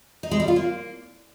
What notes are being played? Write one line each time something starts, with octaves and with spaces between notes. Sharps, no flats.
D#4
G#3
G3
F4
A#3